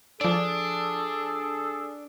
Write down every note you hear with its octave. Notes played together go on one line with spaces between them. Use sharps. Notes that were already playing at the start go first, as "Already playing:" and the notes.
F3 D4 G#4 A4 D5